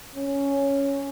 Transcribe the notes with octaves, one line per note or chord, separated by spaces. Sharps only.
C#4